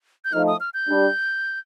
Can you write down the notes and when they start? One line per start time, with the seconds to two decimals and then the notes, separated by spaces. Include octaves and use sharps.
0.25 G6
0.33 F3 A3 D#4 F6
0.47 D#6
0.60 F6
0.74 G6
0.87 G3 D4 G4